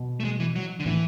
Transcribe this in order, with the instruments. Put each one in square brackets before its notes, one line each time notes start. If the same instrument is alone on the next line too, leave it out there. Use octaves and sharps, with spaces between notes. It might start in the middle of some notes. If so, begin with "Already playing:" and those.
Already playing: [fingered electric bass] B2
[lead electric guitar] A3
G#3
E3
F#3
D3
[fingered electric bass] A2 [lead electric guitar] E3